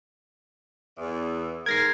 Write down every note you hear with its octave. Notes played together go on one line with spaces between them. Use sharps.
E2
G#2 A#4 G#6 A#6 C7